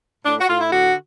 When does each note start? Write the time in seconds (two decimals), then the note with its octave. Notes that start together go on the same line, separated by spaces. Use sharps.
0.24 A2 D4
0.40 F#4
0.48 A2 F4
0.60 E4
0.72 D3 F#4